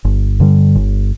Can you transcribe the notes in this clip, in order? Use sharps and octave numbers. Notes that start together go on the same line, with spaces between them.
G1
G2 D3 G3
G1